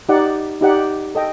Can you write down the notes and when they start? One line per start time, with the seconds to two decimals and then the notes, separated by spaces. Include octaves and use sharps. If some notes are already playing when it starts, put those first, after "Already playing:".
0.09 D#4 G4 D5 F#5
0.61 D#4 G4 D5 F#5
1.15 A4 D#5 G5